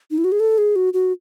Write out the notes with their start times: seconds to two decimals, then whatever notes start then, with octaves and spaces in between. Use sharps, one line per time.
0.11 D#4
0.18 E4
0.24 F#4
0.32 G#4
0.40 A4
0.58 G#4
0.76 F#4
0.93 F#4